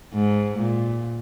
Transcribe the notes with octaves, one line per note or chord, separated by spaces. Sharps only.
G#2
A#2